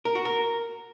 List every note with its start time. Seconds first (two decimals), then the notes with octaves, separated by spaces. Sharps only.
0.05 A#4
0.15 F#4
0.25 A#4